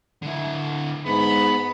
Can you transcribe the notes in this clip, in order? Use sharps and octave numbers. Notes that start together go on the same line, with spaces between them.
D3 E4
G#2 B3 B5